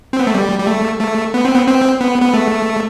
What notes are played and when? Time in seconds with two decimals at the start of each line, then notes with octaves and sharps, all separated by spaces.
0.13 C4
0.19 B3
0.27 A3
0.35 G3
0.59 G3
0.67 A3
1.00 A3
1.34 B3
1.45 C4
1.55 B3
1.67 C4
2.01 B3
2.22 B3
2.34 A3